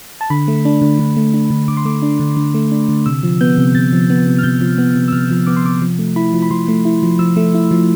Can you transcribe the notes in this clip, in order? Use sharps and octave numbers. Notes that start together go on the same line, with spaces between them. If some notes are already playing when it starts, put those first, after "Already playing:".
A5
D3 B5
A3
D4
D3
D3
A3
D4
D3
D3 D6
C6
A3 D6
D4
D3
D3
A3
D4
D3
C3 E6
F3
B3 G6
C3
C3 A6
F3
B3
C3
F6
C3 G6
F3
B3
C3
E6
C3 F6
F3
B3 D6
C6
C3 D6
F3
A3
E4 B5
F3
B5
F3 C6
A3
E4
F3
F3 E6
A3
E4
F3